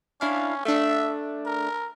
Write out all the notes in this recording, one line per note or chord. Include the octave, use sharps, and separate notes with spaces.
C#4 D4 E4 F5
A3 D4 E5
A#4